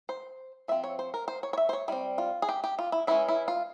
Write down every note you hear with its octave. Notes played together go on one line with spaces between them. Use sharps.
C5
F3 C4 E5
C#5
C5
A#4
C5
C#5
C#5
E5
C5
C#5
G3 C4 E4
F4
G#4
G4
G4
F4
E4
E3 G#3 C#4 E4
E4
F4